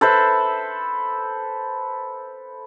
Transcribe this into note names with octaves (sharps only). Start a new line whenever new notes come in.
A4 B4 C5 E5